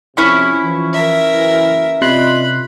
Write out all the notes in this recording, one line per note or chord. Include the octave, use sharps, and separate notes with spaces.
F2 C3 C#4 E4 C#6
E3 F3
A#4 E5
F#1 E3
C3 F4 D5 D#5 B5 C6 F#6